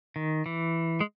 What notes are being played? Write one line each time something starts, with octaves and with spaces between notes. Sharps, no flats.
D#3
E3
G#3